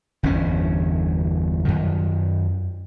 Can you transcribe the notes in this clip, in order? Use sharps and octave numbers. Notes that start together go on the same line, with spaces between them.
G1 E2 G2 C#4
F#2 D#3